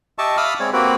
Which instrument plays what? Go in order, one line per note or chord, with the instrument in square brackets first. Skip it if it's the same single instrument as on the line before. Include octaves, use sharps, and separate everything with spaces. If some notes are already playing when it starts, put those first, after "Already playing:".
[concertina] G4 D#5 E5 A5 C#6
E5 F5 B5 D6 D#6 F6
G#3 C4 C#5 D5
A#3 C4 F#4 G4 B4